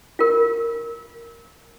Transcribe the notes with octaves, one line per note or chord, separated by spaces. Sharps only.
F4 A#4